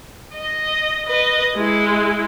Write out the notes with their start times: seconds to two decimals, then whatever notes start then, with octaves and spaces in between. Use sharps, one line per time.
0.35 D#5
1.07 B4 D#5
1.56 G#3 E4